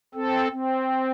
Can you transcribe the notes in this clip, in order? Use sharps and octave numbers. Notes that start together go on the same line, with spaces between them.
C4 A4
C4